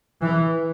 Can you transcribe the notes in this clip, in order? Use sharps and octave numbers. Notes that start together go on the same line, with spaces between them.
E3